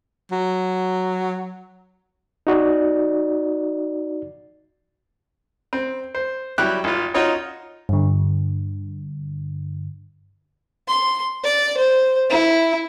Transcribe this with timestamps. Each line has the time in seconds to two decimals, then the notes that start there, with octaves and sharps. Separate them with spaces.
0.31 F#3
2.47 D#4 F#4 D5
5.73 C4
6.15 C5
6.58 F#3 G3 E4 G4 F#6
6.84 G#1 F4
7.14 D#4 F4 F#4 C#5 D#5
7.89 G2 D3
10.88 C6
11.44 D5
11.77 C5
12.30 E4